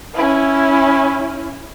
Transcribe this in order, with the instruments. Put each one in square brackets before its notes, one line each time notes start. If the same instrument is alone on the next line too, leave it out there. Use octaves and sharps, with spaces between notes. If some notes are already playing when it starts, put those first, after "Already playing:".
[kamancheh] C#4 E4